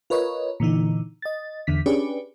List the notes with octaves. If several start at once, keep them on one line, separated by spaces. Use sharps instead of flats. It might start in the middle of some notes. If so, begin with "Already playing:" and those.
F4 A#4 B4 C#5 D#5
A#2 D3 E3 D#4
D#5 A6
E2 D3 B6
C#4 D4 G4 G#4 B4 D5